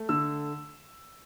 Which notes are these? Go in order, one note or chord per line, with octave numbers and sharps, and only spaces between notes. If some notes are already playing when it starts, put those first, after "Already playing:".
Already playing: A3
D3 E6